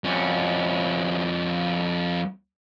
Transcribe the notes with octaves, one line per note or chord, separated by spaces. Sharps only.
F2 C#4